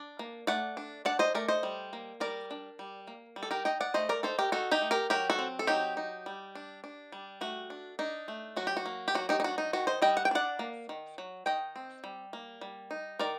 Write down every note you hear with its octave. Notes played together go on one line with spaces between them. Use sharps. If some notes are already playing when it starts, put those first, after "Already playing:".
Already playing: D4
A#3
A3 D5 F#5
D4
D4 D5 F#5
C5 D#5
A3 A#4 D5
C5 D#5
G3
A#3
G3 A#4 D5
D4
G3
A#3
G3
A4
G4 A#4
D#4 D#5 G5
D5 F#5
A3 C5 D#5
A#4 D5
D#4 A4 C5
G4 A#4
D#4 F#4 A4
D#4 G4
A3
G4 A#4
F#3 G4 A#4
F#4 A4
C4
A4
F#3 D#4 G4
D#4
G3
D4
D4
G3
A3 F#4
D4
D4 D#4
A3
F#3 F#4
G4
F#4
A#3
G4
F#3 F#4
D#4 G4
D#4
D4 F#4
D#4
D#3 F#4
C5 D#5
G3 D#5 G5
F#5
G5
D4 D5 F#5
A#3
D#3
F#3
D#3 D#5 G5
C4
G3
A#3
G3
D#4
D#3 A#4 D5